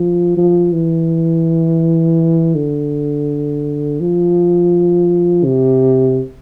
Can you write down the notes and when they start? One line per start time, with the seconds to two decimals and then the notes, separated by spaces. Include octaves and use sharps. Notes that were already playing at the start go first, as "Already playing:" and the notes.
Already playing: F3
0.37 F3
0.73 E3
2.55 D3
4.00 F3
5.45 C3